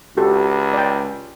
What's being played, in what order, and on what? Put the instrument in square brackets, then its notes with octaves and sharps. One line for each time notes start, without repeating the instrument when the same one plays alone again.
[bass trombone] C#2 [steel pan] F#4 G4 A4
[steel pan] D5 G5